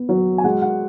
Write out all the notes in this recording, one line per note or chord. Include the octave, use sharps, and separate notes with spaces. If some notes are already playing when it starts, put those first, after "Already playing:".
Already playing: B3
F#3
G#5
G#3 F#5
F#5